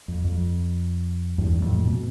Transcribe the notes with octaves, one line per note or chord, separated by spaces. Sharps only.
F2
F2
E2 G2
F2 A2
A2
B2